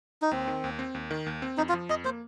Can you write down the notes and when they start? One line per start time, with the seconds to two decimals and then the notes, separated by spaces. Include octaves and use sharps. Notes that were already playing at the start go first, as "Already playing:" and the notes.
0.22 D#4
0.31 D#2 C4
0.48 D#3
0.64 D#2
0.79 C4
0.94 D#2
1.11 D#3
1.26 D#2
1.42 C4
1.57 F2 D#4
1.69 F4
1.74 F3
1.89 F2 D#5
2.05 A#3 C5